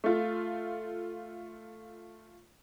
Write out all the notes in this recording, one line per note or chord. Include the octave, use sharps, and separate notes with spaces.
A3 F4